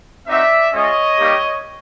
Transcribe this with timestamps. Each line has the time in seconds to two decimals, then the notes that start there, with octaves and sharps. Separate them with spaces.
0.27 C4 D#4 F#4 D5 E5
0.71 G#3 C#4 F4 C#5 D#5
1.17 G3 A#3 D#4 G4